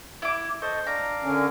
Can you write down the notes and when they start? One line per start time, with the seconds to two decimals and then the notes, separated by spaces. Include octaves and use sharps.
0.22 E4 D6
0.62 A4 C5 D#5 C#6
0.87 D4 F5 A#5 D6
1.24 D3 C#4 A#4